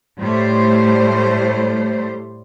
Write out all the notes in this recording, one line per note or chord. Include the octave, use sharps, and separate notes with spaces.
A2 G3 A3 C5